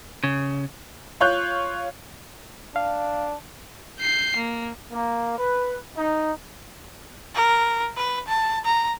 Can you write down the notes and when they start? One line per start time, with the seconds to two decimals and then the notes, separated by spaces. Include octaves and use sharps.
0.24 C#3
1.20 F4 C#5 F#6 G6
2.76 D4 F5
3.99 G6 C7
4.36 A#3
4.91 A#3
5.38 B4
5.96 D#4
7.35 A#4
7.97 B4
8.28 A5
8.65 A#5